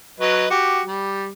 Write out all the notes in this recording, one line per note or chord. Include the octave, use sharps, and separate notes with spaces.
F#3 B4 D#5
F#4 G4
G3